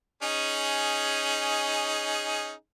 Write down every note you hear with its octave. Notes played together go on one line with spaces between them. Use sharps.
C#4 D#4 G#4